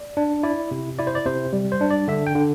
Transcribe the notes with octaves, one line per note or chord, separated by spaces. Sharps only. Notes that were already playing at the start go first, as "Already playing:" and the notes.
Already playing: D5
D4
E4 D5
C3
E4 D5
C5
D5
C3 C5
G3
C5
D4
D5
D3 E5
G5
D3